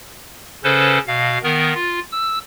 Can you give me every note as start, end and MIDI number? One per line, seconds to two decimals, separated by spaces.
0.64 0.99 49
0.64 0.99 61
0.64 0.99 69
0.64 0.99 71
0.64 0.99 72
1.07 1.38 47
1.07 1.38 77
1.43 1.73 51
1.43 1.73 59
1.43 1.73 70
1.74 2.00 65
2.12 2.38 88